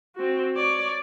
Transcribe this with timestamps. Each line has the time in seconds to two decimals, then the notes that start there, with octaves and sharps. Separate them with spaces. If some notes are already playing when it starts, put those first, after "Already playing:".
0.16 C4 F#4
0.56 C#5 D5